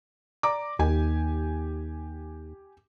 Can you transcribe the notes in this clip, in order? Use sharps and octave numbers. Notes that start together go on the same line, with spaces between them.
D5 A#5 D6
D#2 G4 G#5